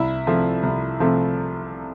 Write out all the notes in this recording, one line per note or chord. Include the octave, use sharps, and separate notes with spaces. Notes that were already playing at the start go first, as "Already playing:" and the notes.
Already playing: C2 E4 E5
C3 F3 A3
C2
C3 F3 A3